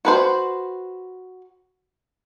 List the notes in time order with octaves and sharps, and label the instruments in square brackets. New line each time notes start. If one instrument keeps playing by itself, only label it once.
[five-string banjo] F#4 B4 C5